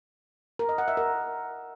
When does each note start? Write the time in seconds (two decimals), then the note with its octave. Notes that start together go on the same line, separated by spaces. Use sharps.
0.59 A#4
0.69 D#5
0.78 F#5
0.88 E5
0.97 A#4